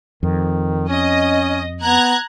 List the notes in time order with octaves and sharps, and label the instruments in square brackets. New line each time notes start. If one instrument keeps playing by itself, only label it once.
[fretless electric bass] F2 [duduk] D#3
[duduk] C#4 [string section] D#5
[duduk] B3 [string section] A#5 F#6 G#6